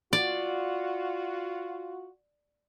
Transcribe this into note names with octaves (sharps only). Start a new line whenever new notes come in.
F4 F#4 D5